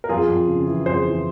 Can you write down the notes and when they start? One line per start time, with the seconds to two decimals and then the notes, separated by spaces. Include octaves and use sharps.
0.04 A#4
0.09 F2 F4 G#4
0.29 F2
0.48 C#3
0.67 E3
0.86 F2 G#4 C5
1.06 E3